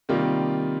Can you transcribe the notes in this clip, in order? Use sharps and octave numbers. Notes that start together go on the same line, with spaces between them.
C3 D#3 G3 A#3 F4